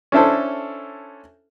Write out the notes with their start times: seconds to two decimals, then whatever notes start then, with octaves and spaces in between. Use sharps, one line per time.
0.12 C#4 D4 E4 A4 C5